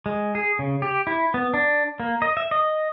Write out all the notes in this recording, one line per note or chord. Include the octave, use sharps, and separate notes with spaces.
G#3
G#4
C#3
G4
E4
B3
D4
A#3
D#5
E5
D#5